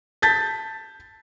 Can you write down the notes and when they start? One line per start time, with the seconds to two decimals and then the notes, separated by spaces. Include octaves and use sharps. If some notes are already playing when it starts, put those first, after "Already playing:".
0.22 A5 G6 A6 B6